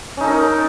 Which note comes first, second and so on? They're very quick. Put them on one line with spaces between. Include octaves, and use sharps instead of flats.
C#4 D#4 A4 A#4